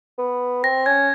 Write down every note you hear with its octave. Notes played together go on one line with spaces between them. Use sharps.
B3
C4 A#6
C#4 G#6